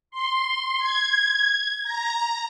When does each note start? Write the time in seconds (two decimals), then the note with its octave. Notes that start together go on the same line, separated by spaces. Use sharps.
0.11 C6
0.78 G#6
1.83 A#5